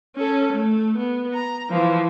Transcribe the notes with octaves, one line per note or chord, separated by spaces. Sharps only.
C#4 A4
A3
B3
A#5
E3 F3